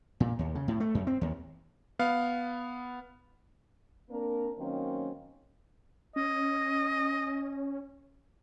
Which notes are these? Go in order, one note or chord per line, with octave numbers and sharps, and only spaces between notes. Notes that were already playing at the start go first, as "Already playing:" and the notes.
A#2
D#2
C#3
A2
A3
F#2
C4
D#2
B3 F5
A#3 C4 D4 A#4
D#3 F#3 A#3 C4 C#4
C#4 D#5